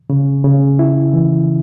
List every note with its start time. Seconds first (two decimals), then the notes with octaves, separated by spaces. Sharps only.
0.10 C#3
0.44 C#3
0.79 E4
1.14 E3